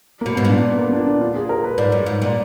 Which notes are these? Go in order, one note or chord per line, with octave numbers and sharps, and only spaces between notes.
B2 A#3
G#2 B3
A#2 D4
B3
A#3
D4
D4
F4
G#4
A#4
B4
G#2 D5
F#2
G#2
A#2 D5